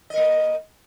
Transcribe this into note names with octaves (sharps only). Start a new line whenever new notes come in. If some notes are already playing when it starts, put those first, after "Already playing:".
A#3 A#4 D#5